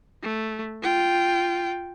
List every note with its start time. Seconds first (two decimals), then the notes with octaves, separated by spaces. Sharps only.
0.23 A3
0.82 F4 G5